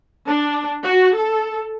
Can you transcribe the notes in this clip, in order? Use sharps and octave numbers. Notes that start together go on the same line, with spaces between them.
D4
F#4
A4